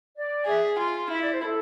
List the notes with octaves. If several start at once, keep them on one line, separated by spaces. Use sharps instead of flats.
D5
G#4 E5
F4
E4 E5
D5
C5
A4